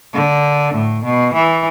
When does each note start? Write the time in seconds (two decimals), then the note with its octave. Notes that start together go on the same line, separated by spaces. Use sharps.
0.14 D3
0.74 A2
1.04 B2
1.34 E3